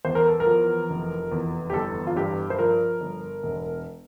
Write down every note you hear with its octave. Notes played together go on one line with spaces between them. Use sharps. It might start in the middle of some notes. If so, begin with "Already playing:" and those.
E2 C5
A#4
A4
A#4
F3
F1
E2
G4
G1 A4
F4
G2 G4
C5
F3 A#4
G1
E1